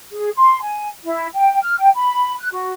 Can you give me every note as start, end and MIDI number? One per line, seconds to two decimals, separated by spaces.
0.13 0.29 68
0.36 0.61 84
0.62 0.88 80
1.04 1.27 64
1.34 1.57 79
1.62 1.75 89
1.78 1.89 79
1.95 2.33 83
2.38 2.47 90
2.52 2.73 66